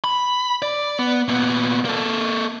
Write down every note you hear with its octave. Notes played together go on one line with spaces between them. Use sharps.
B5
D5
B3
A#2 B3
A#3 A4